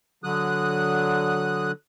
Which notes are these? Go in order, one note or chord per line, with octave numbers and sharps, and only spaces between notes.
D3 F#3 D#6 F#6